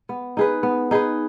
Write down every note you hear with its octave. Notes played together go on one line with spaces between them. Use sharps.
B3
D#4 G#4 B4
B3
D#4 G#4 B4